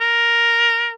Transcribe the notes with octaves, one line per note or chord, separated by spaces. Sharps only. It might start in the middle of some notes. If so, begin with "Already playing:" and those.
A#4